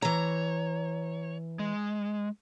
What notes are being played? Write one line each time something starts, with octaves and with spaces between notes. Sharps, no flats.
E3 C#5 A#5
G#3